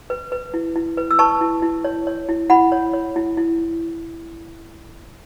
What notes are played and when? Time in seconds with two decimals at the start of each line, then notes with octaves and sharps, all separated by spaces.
0.10 B4
0.32 B4
0.54 E4
0.76 E4
0.97 B4
1.11 E6
1.19 B4 A5 C#6
1.41 E4
1.62 E4
1.84 C#5
2.07 C#5
2.29 E4
2.50 E4 F#5 B5
2.72 C#5
2.93 C#5
3.16 E4
3.37 E4